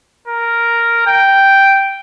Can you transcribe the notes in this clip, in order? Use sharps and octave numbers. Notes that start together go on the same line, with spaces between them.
A#4
G5